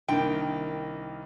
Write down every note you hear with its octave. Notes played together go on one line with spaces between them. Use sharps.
C2 D#3 A#3 D4 G5